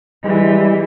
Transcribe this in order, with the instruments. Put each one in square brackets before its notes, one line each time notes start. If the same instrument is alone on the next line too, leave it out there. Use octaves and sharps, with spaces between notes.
[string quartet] E3 [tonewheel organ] G3 [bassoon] G#3